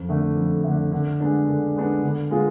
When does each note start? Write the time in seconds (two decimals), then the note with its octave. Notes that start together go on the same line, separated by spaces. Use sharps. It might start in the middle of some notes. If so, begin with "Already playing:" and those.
Already playing: F2
0.09 D3 A3
0.37 F2
0.64 D3 A3
0.92 D3
1.20 G#3 B3 D4
1.48 D3
1.76 G#3 B3 D4
2.03 D3
2.30 G#3 B3 F4 G#4